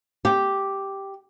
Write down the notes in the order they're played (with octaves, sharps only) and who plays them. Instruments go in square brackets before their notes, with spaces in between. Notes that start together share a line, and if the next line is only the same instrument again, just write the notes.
[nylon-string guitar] G4